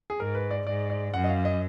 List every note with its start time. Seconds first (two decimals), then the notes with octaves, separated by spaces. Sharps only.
0.10 G#4
0.19 G#2 A#4
0.35 B4
0.51 D5
0.67 G#2 D5
0.90 D5
1.14 F#2 F#5
1.24 D#5
1.30 F5
1.45 D#5